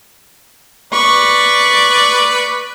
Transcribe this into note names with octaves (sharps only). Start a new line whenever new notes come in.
B4 D5 C#6